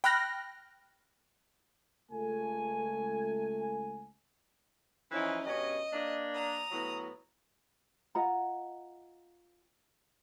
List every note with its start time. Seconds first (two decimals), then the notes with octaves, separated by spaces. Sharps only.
0.04 G5 B5 F6 F#6 A#6
2.11 C#2 A3 G#5
5.11 E3 F3 C#4 D#4 E4
5.46 G2 B2 C#4 D#5
5.93 A#3 D4
6.35 A#5 D#6
6.71 A2 F#3 B3
8.15 F4 D#5 F#5 A#5